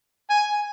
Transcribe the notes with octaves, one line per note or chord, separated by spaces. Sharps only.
G#5